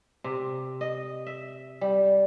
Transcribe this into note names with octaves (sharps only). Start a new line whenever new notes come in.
C3
D#5
E5
G3